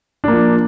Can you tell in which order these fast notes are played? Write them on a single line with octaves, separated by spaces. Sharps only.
D4 A#3 F3